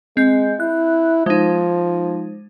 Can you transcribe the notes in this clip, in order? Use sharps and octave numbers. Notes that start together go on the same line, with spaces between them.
G#3 C4 G6
E4 F#6
F3 G#3 D#4